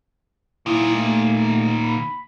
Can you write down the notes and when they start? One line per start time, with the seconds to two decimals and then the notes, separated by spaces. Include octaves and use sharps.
0.66 A#2 D#3 E4
0.95 A3
1.82 B5